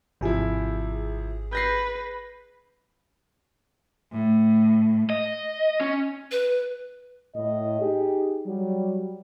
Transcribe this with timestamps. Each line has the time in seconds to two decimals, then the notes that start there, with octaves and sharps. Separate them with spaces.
0.21 G#1 C3 F3 E4 G#4
1.53 B4 G6 A#6 C7
4.12 A2
5.10 D#5
5.81 C#4
6.32 B4
7.35 A2 D#5
7.81 D#4 G4 G#4
8.46 F#3 G3